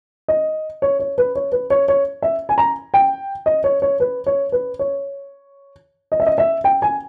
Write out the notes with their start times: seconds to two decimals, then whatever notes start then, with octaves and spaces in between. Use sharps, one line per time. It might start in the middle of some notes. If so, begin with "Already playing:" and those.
0.28 D#5
0.82 C#5
0.99 C#5
1.18 B4
1.35 C#5
1.52 B4
1.70 C#5
1.88 C#5
2.22 E5
2.49 G#5
2.58 A#5
2.94 G5
3.46 D#5
3.64 C#5
3.82 C#5
4.00 B4
4.26 C#5
4.52 B4
4.79 C#5
6.12 D#5
6.20 E5
6.26 D#5
6.38 E5
6.64 G5
6.82 G#5